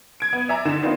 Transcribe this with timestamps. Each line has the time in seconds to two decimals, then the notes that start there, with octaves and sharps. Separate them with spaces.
0.20 G#6 D7
0.33 B3
0.49 D5 E5 G#5 A#5
0.65 D3 D#4 E7
0.82 D#3 B3 C4 D4 D#4 F4